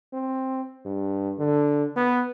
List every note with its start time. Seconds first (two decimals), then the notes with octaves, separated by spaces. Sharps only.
0.13 C4
0.85 G2
1.39 D3
1.96 B3